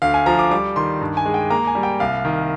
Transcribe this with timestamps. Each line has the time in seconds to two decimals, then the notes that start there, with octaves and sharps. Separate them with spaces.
0.02 D2 F5
0.14 G#5
0.26 F3 A#5
0.39 D6
0.51 G3 D6
0.76 D#3 C6
1.01 G2
1.17 G#5
1.26 G#3
1.34 G5
1.50 A#3 A#5
1.67 G#5
1.75 G3
1.83 G5
2.00 C2 F5
2.25 D#3